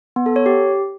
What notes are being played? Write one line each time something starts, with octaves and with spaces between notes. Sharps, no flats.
B3
A4
C#5
G4